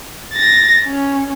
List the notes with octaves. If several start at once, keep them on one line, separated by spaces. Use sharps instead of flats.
A6 A#6
C#4